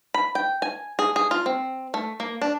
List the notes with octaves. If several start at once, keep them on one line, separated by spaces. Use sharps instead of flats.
B5
G5
G#5
G#4
G#4
F4
C4
A3
A#3
D4